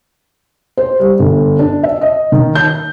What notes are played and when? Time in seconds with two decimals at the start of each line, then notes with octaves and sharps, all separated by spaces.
0.77 C5
1.00 G3
1.19 G1
1.59 D4
1.83 E5
2.01 D#5
2.32 D#3
2.55 G6